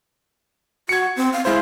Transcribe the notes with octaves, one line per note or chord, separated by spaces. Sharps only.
F#4 G#6 C#7
C4
F5
G#3 E4 C5 F5